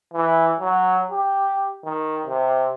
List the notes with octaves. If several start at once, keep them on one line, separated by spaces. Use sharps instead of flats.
E3
F#3
G4
D#3
C3